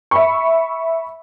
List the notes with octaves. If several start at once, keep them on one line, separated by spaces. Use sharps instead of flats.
E5 B5 C#6